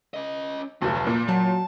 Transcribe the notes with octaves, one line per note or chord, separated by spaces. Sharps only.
C#4 D#5
F1 D2 F3 F#3
A#2 A#3
F#3 A5